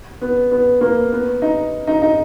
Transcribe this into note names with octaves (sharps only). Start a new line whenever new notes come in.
B3
B3
A#3
B3
D#4
D#4
D#4